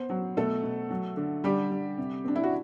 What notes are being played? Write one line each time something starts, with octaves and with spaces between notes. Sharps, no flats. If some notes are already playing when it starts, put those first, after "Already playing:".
Already playing: B3 C5
F#3
B2 A3 A4
B2
F#3
D3
D3 G3 G4
G3
C3
C4 D4
E4
F#4